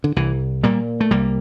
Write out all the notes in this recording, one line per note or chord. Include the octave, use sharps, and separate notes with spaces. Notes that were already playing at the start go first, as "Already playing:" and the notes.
D3
C2 E3
A#2 G3 A#3
A3
C2 G3 A#3